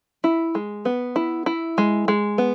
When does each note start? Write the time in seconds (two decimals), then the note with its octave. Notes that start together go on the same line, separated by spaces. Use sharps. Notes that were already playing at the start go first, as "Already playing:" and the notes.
0.24 E4
0.55 G#3
0.85 B3
1.16 E4
1.46 E4
1.78 G#3
2.08 G#3
2.38 B3